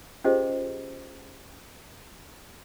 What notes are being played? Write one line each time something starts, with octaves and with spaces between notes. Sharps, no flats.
C#4 F4 G4 G#4 C5 D#5